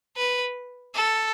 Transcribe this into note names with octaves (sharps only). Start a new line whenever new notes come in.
B4
A4